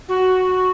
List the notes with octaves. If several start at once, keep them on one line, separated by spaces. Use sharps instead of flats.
F#4